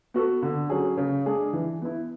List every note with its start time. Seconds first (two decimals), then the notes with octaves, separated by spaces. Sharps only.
0.14 B3 F#4 A4
0.42 D3
0.70 F#3 C#4 G#4
0.97 C#3
1.26 G#3 D4 G#4
1.53 E3
1.82 B3 E4